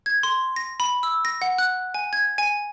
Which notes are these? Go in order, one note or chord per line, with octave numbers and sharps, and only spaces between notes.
G#6
C6
A#6
B5
E6
A#6
F#5
F#6
G#5
G#6
G#5